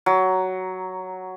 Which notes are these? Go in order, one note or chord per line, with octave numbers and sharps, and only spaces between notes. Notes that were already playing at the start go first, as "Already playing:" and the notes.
F#3